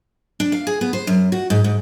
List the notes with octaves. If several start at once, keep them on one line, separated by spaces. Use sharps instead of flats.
D4
F5
G#4
B3
C5
F#2
F#4
G#2
G#2